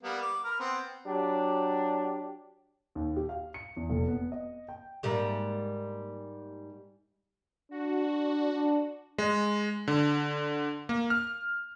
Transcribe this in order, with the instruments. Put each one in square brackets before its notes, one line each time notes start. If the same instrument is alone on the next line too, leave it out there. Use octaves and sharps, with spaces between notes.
[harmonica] G3 A#3 B3
D6
A#4 B4 F6
B3 C4 C5
[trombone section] F#3 D4 G4
[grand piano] D#2
G4
F5
C#7
E2
F1
B3
D#5
G5
[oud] G#2 G3 A#3
[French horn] D4 [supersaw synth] F#4
[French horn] D4
[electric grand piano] G#3
D3
A#3
F6